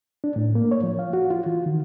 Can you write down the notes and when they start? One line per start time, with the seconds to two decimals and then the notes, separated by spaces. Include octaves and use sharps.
0.24 D4
0.36 A2
0.55 A#3
0.71 C#5
0.83 F3
0.99 F5
1.13 F#4
1.31 F4
1.46 E3
1.66 D#3